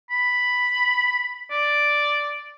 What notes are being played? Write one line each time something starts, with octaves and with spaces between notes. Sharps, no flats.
B5
D5